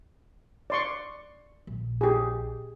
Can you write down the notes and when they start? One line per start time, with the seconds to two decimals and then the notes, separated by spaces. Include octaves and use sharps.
0.70 D5 C6 C#6
1.67 A#1
2.01 G4 G#4